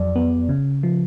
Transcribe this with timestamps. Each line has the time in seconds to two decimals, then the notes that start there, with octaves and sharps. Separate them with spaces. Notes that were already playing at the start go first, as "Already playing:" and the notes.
Already playing: F2 F#3 D5
0.16 B3
0.49 C#3
0.83 F3